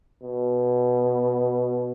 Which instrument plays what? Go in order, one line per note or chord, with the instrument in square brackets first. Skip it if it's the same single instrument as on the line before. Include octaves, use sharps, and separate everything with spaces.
[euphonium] B2